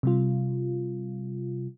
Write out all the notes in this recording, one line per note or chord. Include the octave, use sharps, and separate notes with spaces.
C3 G3 F4